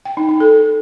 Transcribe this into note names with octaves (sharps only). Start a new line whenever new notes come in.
G5
D#4
D#4
A4